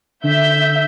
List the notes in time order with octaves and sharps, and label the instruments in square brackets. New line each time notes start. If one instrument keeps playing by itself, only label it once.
[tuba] D3 [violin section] E5 G6